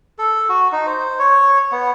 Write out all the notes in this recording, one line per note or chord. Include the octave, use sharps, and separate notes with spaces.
A4
F#4
D#4
C5
C#5
B3